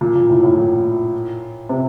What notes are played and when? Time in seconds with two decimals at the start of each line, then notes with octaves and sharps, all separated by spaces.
0.01 A#2
0.15 A#2
0.30 A2
0.43 A2
0.57 A#2
1.69 C3